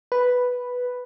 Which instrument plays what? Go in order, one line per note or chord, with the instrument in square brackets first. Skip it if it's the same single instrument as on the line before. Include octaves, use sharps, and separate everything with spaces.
[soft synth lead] B4